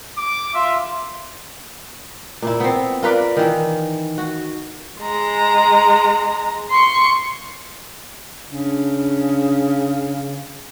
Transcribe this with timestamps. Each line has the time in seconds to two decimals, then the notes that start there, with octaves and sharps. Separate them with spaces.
0.18 D6
0.54 F4 E5
2.42 A#2 E4
2.60 B3 C4
3.03 F4 A#4 B4 D5
3.37 D#3 E3
4.18 F#4
5.01 G#3 A#5
6.71 C6 C#6
8.51 C#3 D4